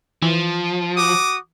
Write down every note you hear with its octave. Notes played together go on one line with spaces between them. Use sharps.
E3 F3
F#4 D6 D#6